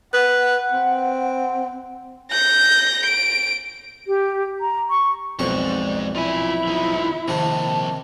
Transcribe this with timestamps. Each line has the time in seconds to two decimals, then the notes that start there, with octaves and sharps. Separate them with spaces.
0.14 B4 F#5
0.72 C4
2.31 G6 A#6
3.06 D7
4.07 G4
4.61 A#5
4.90 C#6
5.39 B1 F2 G#2 D5 C#6
6.15 E4 F4 G#5
6.67 E2 D#4 F4
7.28 C3 D#3 F3 A#3 A5